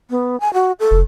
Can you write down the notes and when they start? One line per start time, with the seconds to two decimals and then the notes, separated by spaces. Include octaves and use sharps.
0.10 B3
0.40 G#5
0.54 F#4
0.80 A4
0.91 F1